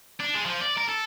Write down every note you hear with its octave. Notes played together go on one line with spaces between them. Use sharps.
D4
G#3
F3
D5
A#4
A4